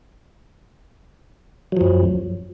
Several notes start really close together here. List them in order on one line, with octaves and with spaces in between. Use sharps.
F#3 F3 F#2